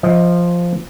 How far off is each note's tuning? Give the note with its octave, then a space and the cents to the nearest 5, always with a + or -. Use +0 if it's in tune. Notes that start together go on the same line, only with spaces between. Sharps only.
F3 +0 D#5 +20